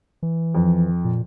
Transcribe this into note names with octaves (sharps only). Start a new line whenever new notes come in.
E3
F2
A#2